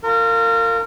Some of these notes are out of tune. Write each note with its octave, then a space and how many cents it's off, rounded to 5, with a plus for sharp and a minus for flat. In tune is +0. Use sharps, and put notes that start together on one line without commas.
F4 +0 A#4 -30